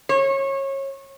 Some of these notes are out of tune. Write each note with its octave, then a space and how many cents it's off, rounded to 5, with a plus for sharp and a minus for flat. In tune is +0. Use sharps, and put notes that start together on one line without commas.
C#5 -25